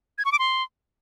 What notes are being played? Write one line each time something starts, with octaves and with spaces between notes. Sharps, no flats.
G#6
C#6
D6
C6